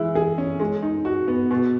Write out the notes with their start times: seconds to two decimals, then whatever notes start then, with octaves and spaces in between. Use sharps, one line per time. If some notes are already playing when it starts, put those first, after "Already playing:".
Already playing: E3 G#3 E4
0.15 G#4
0.38 C#4
0.60 G#3
0.82 D#4
1.05 F#4
1.28 B3
1.51 B2